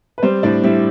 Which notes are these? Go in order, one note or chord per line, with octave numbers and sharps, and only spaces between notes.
B4
G3 C4 C5
A2 D4 D5
G3 E4 E5